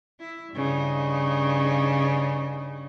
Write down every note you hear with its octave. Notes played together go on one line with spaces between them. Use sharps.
E4
G2 C#3 D#4